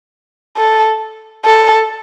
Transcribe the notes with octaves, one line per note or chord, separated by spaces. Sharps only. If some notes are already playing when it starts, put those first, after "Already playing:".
A4
A4